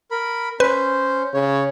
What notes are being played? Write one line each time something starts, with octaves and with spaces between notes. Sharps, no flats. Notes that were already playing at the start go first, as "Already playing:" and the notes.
A#4 B5
C#4 B4 C5
C#3 C#5